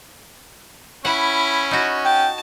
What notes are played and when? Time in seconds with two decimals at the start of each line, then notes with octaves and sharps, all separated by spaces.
1.05 C#4 E4 F#5 B5
1.71 D#4 F#4
2.05 G5 A5